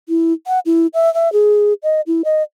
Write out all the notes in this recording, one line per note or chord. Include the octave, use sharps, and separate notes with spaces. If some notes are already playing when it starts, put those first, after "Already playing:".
E4
F#5
E4
E5
E5
G#4
D#5
E4
D#5